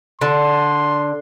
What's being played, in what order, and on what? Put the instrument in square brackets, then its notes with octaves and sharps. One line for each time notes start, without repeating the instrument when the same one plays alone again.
[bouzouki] D3 [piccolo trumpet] C6